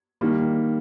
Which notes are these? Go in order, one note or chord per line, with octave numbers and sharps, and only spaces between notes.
D#3 G3 A#3